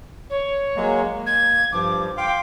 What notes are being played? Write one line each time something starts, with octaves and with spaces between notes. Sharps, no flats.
C#5
F#3 G#3 A#3
A#3
G#6
G2 F3 D6
F5 G5 C6 D6